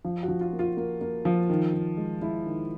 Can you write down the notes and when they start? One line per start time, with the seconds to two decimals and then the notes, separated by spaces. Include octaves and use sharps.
0.05 F3
0.23 F#4
0.28 F3
0.41 F4
0.53 A#3
0.59 F4
0.77 A#3
1.01 A#3
1.25 F3
1.50 D#3
1.73 D#3
1.97 G#3
2.21 G#3 E4
2.46 D#3